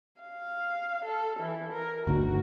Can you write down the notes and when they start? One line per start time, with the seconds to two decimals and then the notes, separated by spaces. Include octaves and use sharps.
0.21 F5
1.06 A4
1.40 E3
1.73 A#4
2.07 G1 D2 D#3 F#4